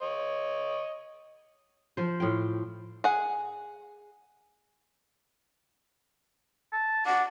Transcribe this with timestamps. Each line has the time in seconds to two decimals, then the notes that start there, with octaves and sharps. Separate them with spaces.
0.02 C#5 D#5
1.97 F3 C5
2.20 A2 F4 G5
3.04 G#4 F#5
6.73 A5
7.06 D4 F#5